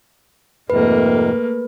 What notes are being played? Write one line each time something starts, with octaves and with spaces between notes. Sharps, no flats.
F2 G#2 C3 A3 A#3 B4